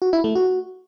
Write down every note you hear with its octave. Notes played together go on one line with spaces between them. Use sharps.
F#4
E4
A3
F#4